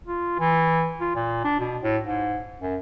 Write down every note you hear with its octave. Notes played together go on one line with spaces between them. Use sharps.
F4
E3
F4
A#2
D4
B2
A2
G#2
F#2